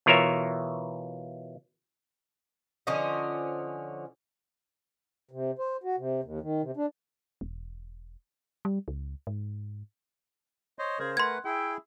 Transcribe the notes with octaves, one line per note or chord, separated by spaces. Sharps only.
B2 E3 F4 A#4 C#5 E5
D3 F3 C#4 D#5
C3
C5
F#4
C3
D#2
D#3
C3
D4
E1
G3
C#2
G#2
C5 C#5 D#5
C#3 G#4 A#4 C5
A3 B4 F#5 C6 G#6
E4 G#4 E5 G5